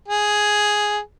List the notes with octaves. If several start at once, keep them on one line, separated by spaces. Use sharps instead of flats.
G#4